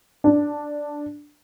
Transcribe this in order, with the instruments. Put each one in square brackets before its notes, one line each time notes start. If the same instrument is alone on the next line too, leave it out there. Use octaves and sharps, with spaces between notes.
[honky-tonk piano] D4